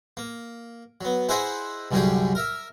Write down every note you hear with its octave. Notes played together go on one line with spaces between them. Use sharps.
A#3
F#3 B3
E4 G#4 C5 D#5 E5 F#5
C2 F#2 D3 G3 G4 G#4
A#4 E5